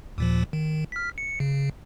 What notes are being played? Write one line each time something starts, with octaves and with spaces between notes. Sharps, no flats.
D#2 A#2 F3
D#3
F6 B6
C#7
C#3